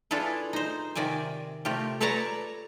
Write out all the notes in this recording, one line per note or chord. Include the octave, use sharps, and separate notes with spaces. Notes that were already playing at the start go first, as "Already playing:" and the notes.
D4 E4 F4 G#4 A4 B4
D#4 C5
C3 D#3 D5 E5 G#5
C3 A3 F4 G4
A4 B4 C#5 D5 A5 A#5